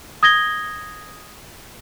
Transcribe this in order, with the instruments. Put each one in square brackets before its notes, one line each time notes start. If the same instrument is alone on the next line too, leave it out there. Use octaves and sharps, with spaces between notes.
[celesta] D#6 G#6 A#6 G7